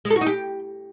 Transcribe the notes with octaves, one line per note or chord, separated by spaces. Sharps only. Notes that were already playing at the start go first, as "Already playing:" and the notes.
G#3
A4
F#4
D#4
G4